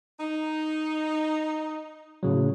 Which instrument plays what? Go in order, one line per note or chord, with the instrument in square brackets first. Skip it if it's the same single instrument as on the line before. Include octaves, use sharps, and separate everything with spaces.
[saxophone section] D#4
[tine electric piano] A2 C#3 F#3